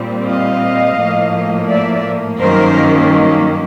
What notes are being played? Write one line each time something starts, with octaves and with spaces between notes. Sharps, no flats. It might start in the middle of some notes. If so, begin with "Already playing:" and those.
Already playing: A#2 G3 C4
D#5 F5
A2 F3 A#3
D5 E5
G2 D#3 F#3 A#3 C#4 A#4 C5